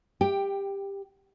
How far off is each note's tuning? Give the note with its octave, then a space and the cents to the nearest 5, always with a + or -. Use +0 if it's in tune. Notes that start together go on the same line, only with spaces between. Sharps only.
G4 +15 G5 +0